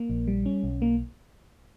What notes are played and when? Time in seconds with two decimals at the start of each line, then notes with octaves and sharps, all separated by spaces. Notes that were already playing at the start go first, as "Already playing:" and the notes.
Already playing: A#3
0.10 A#1
0.28 G3
0.46 C#4
0.63 B1
0.82 A#3